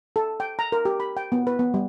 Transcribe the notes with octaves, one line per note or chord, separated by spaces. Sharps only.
A4
G5
A#5
A#4
G4
B5
G5
B3
B4
B3
G3